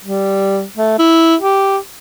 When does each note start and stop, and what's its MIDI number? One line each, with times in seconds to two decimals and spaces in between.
0.04 0.64 55
0.77 0.96 57
0.99 1.36 64
1.40 1.77 67